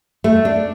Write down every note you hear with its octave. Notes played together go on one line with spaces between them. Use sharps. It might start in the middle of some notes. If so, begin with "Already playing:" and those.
A3
D4